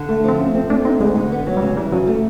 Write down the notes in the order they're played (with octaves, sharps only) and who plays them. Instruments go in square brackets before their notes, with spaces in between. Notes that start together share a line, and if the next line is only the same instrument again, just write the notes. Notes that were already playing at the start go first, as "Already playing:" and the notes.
Already playing: [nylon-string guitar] D3
A3
[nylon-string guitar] F3 [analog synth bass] C4
[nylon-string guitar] A3 [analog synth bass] C#4
[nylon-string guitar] C4
[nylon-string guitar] A3 [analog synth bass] D4
[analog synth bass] C4 [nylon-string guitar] D#4
[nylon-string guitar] D2 [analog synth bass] G#3
[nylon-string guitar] D3
B3
F#3
[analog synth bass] G3
[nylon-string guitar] C#3 [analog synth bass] G#3
[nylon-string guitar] E3 [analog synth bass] G3
[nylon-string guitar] C#3 [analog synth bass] F#3
[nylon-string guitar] A3